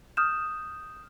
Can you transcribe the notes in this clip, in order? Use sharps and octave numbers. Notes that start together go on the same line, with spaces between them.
D#6 F6 G6 E7